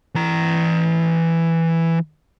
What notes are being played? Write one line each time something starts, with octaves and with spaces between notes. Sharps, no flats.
E3 A#5